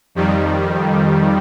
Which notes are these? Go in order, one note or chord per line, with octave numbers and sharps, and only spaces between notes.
F2 D#3 G3